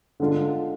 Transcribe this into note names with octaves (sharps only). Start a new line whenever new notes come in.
D3 G#3 D4 F4